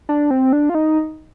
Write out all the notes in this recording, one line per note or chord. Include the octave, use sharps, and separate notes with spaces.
D4
C4
D4
F4
D#4